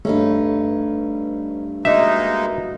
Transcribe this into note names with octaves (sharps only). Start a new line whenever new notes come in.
G2 A3 C#4 D#4 B4
G#3 A#3 D#4 F#4 B4 D#5 E5